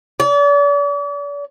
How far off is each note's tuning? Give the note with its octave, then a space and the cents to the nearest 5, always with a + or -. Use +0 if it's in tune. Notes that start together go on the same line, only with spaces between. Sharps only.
D5 -40